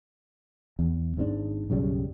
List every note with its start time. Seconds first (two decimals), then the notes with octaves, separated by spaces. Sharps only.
0.79 E2
1.17 G#1 G#2 C#4 D4
1.70 B1 F#2 C#3 G3